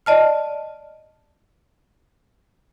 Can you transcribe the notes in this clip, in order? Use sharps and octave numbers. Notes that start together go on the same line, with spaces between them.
D5 D#5 A5 F6